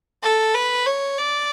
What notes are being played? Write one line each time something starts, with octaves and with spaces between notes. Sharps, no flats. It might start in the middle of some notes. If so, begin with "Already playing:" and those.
A4
B4
C#5
D5